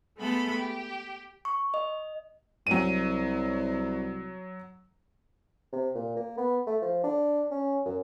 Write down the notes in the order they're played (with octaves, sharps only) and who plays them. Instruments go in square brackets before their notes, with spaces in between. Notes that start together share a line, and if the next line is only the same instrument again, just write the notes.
[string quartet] G#3 A3 B3 A4 B5
G4
[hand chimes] C#6
D#5
[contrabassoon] C2 [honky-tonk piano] F#3 D#7
[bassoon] C3
A#2
A#3
B3
A3
F3
D4
C#4
F#2